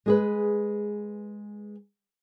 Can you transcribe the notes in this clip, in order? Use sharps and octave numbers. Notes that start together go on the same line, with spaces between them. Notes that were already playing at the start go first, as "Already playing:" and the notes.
G#3 G#4 B4